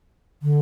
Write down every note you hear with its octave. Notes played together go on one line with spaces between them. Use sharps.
D3